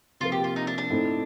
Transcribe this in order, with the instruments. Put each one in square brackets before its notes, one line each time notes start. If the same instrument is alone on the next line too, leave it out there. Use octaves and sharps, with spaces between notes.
[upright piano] C3 F3 A#3 [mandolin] F4
[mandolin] G4
F4
D#4
D4
D4
[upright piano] A2 A3 C4 D#4